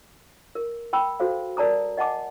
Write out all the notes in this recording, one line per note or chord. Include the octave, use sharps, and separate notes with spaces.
A#4
G5 B5 E6
F#4 A4 C5 F5
A#4 D5 A5 A#5 D#6
D#5 F#5 G#5 A5 D6